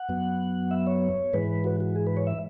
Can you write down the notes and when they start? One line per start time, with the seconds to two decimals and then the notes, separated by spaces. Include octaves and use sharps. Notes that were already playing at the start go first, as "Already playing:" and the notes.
Already playing: F#5
0.09 F#2 F#3 B3
0.71 E5
0.87 C#5
1.33 G#2 E3 G#3 B4
1.64 F#4
1.80 F#4
1.96 G#4
2.07 B4
2.17 C#5
2.27 E5